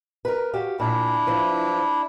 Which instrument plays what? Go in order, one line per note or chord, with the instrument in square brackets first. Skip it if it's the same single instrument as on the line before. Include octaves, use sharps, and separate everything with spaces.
[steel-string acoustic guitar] A#4 B4
F#4 G4 F5
[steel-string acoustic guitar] A#2 [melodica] D4 E4
[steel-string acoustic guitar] E3 F3